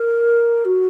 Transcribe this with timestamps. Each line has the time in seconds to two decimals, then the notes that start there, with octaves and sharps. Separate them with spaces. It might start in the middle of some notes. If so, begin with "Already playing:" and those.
Already playing: A#4
0.65 F#4